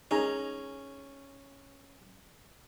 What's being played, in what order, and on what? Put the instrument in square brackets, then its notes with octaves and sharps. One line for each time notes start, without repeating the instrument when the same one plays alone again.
[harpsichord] C#4 [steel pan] D#4 G#4 A#5